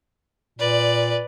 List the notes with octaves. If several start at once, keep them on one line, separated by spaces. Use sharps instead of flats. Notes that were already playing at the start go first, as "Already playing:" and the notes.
A#2 B4 D5